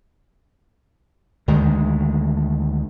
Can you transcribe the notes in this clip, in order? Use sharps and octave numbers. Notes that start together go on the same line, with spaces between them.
D2 D#3 G#3